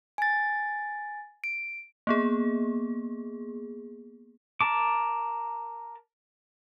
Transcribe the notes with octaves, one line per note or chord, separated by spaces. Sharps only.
G#5 A6
D7
A#3 B3 G#4
A#4 A5 D6